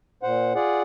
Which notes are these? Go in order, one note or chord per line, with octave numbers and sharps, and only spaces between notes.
A#2 C5 F#5
F4 G#4 D5 F#5